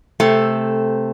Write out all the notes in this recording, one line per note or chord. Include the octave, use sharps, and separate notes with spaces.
C3 A3 C4 A4